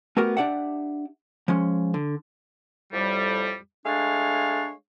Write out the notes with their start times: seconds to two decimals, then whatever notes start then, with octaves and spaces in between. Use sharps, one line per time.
0.17 A3 B3 F#4 G4 A#4
0.37 D4 G4 D5 E5 F#5
1.48 F3 G#3 C#4
1.94 D3
2.93 F2 A2 G3
3.86 G#3 A3 D4 C#5 F5